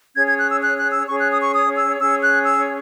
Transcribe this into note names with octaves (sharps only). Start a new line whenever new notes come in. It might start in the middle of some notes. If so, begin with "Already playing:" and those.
C#4 G#4 C#5 G#6
G#6
F#6
E6
F#6
F#6
E6
C#4 G#4 C#5 C#6
F#6
D#6
C#6
D#6
E6
C#4 G#4 C#5 E6
F#6
E6